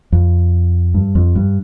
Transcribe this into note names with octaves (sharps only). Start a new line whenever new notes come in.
F2
G2
F2
G2